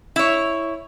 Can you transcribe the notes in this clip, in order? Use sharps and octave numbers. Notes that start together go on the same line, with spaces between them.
E4 C#5